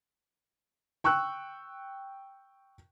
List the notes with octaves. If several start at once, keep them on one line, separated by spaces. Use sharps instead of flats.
G5 C#6 E6 F#6